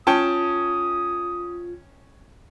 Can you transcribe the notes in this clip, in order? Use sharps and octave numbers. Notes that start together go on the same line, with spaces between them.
C#4 F4 G5 A5 D#6